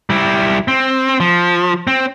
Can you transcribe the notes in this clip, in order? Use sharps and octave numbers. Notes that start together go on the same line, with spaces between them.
G3 E4
C4
F3
C4